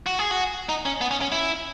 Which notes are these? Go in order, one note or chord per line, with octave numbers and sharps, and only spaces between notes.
F#4
G#4
F#4
D#4
C#4
B3
C#4
C#4
E4